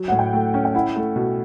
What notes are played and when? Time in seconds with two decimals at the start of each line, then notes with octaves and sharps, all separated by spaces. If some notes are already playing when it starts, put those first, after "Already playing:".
Already playing: F#3
0.08 A2 F#5
0.19 G5
0.33 A3
0.54 C#4
0.65 G5
0.75 E4 F#5
0.96 A3
1.16 B2